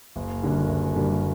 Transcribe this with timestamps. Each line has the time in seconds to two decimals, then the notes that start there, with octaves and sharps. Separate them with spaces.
0.16 F#1
0.43 F#2 D3 G3 A#3
0.69 F#1
0.96 F#2 D3 G3 A#3